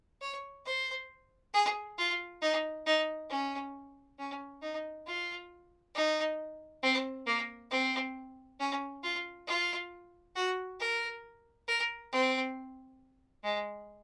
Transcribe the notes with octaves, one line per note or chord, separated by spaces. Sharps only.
C#5
C5
G#4
F4
D#4
D#4
C#4
C#4
D#4
F4
D#4
C4
A#3
C4
C#4
F4
F4
F#4
A#4
A#4
C4
G#3